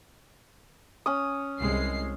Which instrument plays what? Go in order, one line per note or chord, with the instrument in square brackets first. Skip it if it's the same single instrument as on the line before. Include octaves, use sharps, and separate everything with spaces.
[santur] C#4 D#6
[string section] C2 G#3 C7